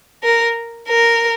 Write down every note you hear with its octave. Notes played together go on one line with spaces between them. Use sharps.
A#4
A#4